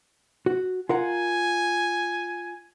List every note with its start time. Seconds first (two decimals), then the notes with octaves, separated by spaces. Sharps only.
0.46 F#4
0.89 F4 A#4 F#5 G#5